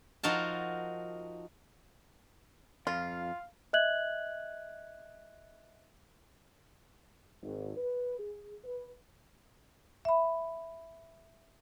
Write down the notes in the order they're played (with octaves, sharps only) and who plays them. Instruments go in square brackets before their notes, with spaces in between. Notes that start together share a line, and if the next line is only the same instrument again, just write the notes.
[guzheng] F3 D#4 F#4 A#4 A5
[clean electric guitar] F2 [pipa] F4 [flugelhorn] F5
[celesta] D#5 E5 F#6 G#6 F#7
[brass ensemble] G#1
B4
G#4
B4
[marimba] E5 B5